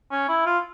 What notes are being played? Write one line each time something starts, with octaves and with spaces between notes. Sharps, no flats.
C#4
E4
F4